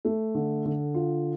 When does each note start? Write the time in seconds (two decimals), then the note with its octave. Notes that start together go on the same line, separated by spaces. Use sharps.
0.05 A3
0.35 D3
0.65 D3
0.94 F4